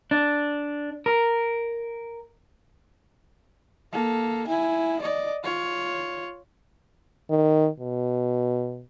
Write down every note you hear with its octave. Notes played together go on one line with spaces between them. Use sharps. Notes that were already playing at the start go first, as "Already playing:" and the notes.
D4
A#4
A#3 A4
E4 G#5
D5 D#5
F4 C#5
D#3
B2